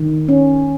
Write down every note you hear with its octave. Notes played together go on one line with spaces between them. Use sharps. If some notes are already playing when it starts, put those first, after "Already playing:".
Already playing: D#3
C#4